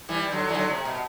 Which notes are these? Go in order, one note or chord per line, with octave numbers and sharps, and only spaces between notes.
E3 G3
D3 F#3
E3
D3 F#3
C3
B2